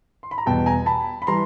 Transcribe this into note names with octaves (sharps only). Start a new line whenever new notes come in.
C6
B5
A#5
E2 B2 G3 G5 A5
G#5 A#5
A5 B5
B5
E3 G3 A#5 C6